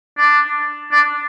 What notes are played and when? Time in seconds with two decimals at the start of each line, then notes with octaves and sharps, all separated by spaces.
0.18 D4
0.92 D4